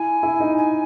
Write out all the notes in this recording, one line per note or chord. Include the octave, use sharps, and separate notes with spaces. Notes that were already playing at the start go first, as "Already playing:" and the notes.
Already playing: E4 G#5
E4
D#4
G#5